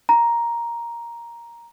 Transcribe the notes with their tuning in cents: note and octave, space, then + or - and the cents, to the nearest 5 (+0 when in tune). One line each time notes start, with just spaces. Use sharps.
A#5 +5